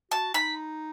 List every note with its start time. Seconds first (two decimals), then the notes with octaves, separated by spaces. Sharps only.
0.11 F#4 A5
0.34 D#4 B5